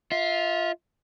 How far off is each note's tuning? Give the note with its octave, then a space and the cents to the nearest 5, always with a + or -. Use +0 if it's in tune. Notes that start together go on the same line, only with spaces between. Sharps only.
F4 +0 E5 -35